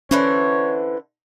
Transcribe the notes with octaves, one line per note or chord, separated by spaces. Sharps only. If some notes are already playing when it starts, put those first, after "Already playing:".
D3 E3 C#4 C5 C#5